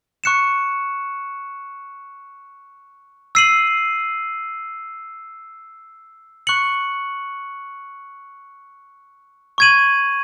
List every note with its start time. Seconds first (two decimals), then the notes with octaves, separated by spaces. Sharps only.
0.24 C#6 F#6 C#7 E7
3.35 E6 C7 D#7 F#7
6.47 C#6 F#6 C#7 F#7
9.58 C#6 G#6 D#7 F#7